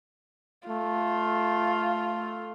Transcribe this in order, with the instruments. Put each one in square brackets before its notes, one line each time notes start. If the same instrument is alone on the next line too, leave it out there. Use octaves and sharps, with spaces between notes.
[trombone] A3 [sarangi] F4